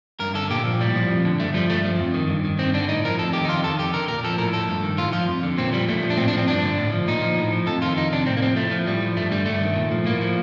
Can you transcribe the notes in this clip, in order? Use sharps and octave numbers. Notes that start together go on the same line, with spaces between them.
G2 A#4
D3 A4
A#2 G4
F3
A2 G3
F3
F2
D3
G2 A3
F3 G3
G2 A3
F3
F2
D#3
G2
D#3
G2 C4
D3 D4
A2 D#4
F3 A#4
F2 A4
D#3 G4
D#4
F2 F4
D#3 A4
F2 G4
D3 A#4
A#2 A#4
F3 A4
A2 A#4
F3 A4
G2
D#3
A2 F4
F3 F4
F2
D3
A#2 C4
F3 G3
A#2 A3
F3
D4
A2 C4
D4
F3 C4
G2 D4
D3
A2
F3
A#2 D#4
F3
A2
F3
F2 A4
D#3 F4
F2 D#4
C3 D4
A2 C4
A#3
F3 C4
A2 A3
F3
A2 G3
F3
G2 A3
D3 G3
G2 A3
D#3
A#2
F3
A2 A#3
F3